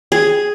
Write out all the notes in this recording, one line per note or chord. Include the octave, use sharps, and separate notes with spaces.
G#4